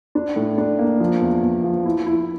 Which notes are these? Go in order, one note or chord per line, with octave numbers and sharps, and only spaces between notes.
D4
A2
D4
A#3
F3
E2
E2
F3
E4
E4